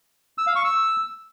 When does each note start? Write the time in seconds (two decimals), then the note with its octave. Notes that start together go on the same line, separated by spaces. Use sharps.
0.38 E6
0.47 F5
0.56 C#6
0.64 E6